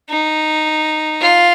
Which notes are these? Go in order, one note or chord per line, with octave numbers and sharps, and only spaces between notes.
D#4
F4